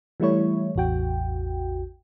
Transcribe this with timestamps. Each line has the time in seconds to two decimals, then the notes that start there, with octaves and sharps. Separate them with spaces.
0.20 E3 G3 A3 E4 C#5
0.75 A1 E2 F#4 G5